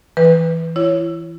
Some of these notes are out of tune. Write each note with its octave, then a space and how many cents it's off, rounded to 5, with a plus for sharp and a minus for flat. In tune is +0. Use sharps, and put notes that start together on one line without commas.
E3 +0 B4 +0
E4 +30 C#5 +0